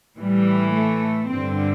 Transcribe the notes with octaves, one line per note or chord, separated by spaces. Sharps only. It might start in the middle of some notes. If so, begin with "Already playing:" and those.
A2 E3 G3
A3
G2 D3 C4